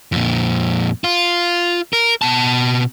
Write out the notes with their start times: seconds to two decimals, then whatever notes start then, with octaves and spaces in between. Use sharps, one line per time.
0.12 F2 A#2
1.04 F4
1.93 A#4
2.22 B2 A5